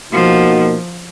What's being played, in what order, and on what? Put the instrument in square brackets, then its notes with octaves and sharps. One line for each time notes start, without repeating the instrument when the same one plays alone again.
[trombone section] B2 A#3 D#4 F#4 [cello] F3